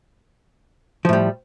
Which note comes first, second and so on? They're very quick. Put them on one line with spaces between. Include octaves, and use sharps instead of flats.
F3 A2 G3